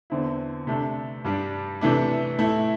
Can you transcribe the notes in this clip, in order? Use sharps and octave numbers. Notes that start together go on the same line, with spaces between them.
E2 D3 C4 E4
C3 A3 D4
G2 G3 D4
C3 E3 A3 D4
A2 A3 E4